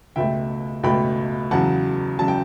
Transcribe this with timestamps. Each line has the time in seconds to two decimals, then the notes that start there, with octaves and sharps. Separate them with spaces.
0.16 C#2 B2 A3 E5 G5
0.83 C#2 B2 A3 G5 B5
1.51 E2 C#3 F#3 F#5 A5
2.19 C#3 F#3 A5
2.28 G5